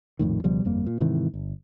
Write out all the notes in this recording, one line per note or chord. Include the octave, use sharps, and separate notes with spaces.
A#1 F2 A2 D#3
C#2 B2 F3 G3
G1 F2 G3 A#3
A#2
G#2 C3 D#3 E3
G1